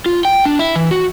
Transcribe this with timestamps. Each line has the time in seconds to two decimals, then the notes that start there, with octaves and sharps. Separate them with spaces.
0.06 F4
0.25 G5
0.46 D4
0.59 E4
0.76 E3
0.91 F#4